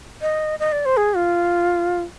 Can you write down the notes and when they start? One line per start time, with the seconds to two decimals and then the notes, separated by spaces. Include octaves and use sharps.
0.22 D#5
0.59 D#5
0.72 D5
0.86 C5
0.97 G#4
1.16 F4